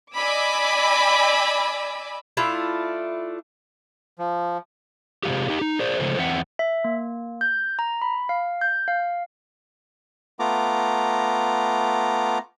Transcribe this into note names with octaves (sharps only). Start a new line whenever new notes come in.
D5 D#5 G#5 B5 D6 E6
A3 D4 E4 F4
F3
C3 E3 G#3 F4 G4
D#4 G4
D#4
G#4 C5 D5
C#3 F3 G#3 A3 C5
E2 C4 E5 F#5
E5
A#3
G6
A#5
B5
F5
G6
F5
A3 B3 F4 A#5 D6